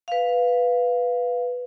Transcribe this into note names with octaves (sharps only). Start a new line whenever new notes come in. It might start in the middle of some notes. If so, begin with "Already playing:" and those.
B4 F5